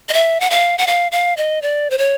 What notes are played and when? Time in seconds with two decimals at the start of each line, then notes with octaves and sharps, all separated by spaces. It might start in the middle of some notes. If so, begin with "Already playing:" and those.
0.09 D#5
0.13 E5
0.41 F#5
0.50 F5
0.78 F#5
0.87 F5
1.12 F5
1.37 D#5
1.62 D5
1.90 C5
1.98 C#5